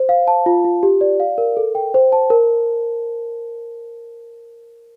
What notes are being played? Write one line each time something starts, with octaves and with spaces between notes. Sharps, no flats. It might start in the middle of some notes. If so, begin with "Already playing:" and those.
Already playing: C5
F5
A5
F4
F4
G4
D5
F5
A#4
A4
G5
C5
A5
A#4